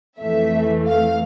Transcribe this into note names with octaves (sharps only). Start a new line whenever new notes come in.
F2 E3 A3 E5
F5